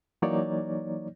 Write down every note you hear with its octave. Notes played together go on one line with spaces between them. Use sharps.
E3 F#3 A#3 D#4 C#5 D5